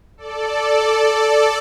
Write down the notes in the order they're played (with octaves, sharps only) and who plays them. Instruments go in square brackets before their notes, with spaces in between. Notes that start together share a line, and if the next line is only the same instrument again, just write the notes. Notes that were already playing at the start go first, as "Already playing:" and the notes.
[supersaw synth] A4 D5